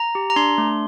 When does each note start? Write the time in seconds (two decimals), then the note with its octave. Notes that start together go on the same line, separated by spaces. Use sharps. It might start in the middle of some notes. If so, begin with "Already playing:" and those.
Already playing: A#5
0.15 G4
0.30 A#5
0.36 D4 C6
0.58 A3